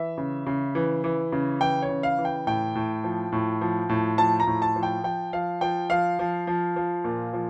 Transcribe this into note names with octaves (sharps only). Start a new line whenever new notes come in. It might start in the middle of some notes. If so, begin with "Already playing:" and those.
Already playing: E3 E5
C#3
C#3
E3
E3
C#3
E3 G5
C#5
C#3
F5
E3
G5
A2 G5
A2
F3
A2
F3
A2
F3 A5
A#5
A2
A5
F3
G5
F3 G5
F3 F5
F3 G5
F3 F5
F3
F3
F3
A#2
F3